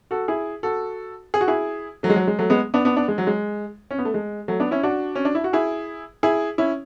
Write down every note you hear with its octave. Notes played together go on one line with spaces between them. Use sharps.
F#4 A4
E4 G#4
F#4 A4
G#4
F#4
E4 G#4
F#3 A3
G#3
F#3
G#3
F#3 A3
G#3 B3
B3 D4
B3 D4
B3 D4
G#3
F#3
G#3
C#4
B3
A3
G#3
F#3 A3
B3 D4
C#4 E4
D4 F#4
C#4
D4
E4
F#4
E4 G#4
E4 G#4
C#4 E4